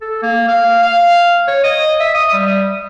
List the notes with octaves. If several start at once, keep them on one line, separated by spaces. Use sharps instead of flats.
A4
A#3
F5
F5
C#5
D#5
E5
D#6
G3